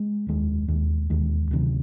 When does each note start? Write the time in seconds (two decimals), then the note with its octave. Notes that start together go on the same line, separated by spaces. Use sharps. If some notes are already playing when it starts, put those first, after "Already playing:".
Already playing: G#3
0.26 F1 D#2 D#3 G#3
0.68 E1 D#2 D#3 G#3
1.10 E1 D#2 D#3 G#3
1.51 D2 C3 D#3 F#3